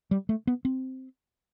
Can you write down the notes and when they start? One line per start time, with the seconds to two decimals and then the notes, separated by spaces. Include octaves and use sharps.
0.11 G3
0.29 A3
0.47 B3
0.65 C4